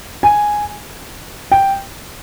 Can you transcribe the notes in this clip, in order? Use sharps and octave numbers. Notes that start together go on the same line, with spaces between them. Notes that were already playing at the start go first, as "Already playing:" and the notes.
G#5
G5